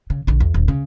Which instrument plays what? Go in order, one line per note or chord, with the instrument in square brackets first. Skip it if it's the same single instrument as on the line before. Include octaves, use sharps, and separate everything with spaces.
[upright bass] C#3
A#1 D3
E2
D#1
C#3